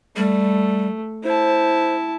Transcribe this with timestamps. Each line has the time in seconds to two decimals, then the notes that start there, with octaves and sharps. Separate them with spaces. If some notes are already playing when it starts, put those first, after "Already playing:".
0.16 G3 A3
1.24 E4 C5 A5